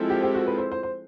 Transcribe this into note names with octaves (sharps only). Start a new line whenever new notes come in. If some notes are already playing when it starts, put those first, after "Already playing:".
Already playing: F3 G#3 C4 E4 A4
G4
G4
F#4
B4
C5
C5
C5